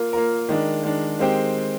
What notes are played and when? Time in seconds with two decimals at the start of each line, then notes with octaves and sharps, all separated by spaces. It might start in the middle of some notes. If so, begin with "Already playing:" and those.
Already playing: A#3 F4 A#4
0.13 A#3 F4 A#4
0.49 D#3 G#3 D4
0.83 D#3 G#3 D4
1.19 D#3 G#3 C4 G4